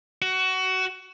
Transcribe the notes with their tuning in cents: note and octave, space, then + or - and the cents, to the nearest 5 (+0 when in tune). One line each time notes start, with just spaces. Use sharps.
F#4 +20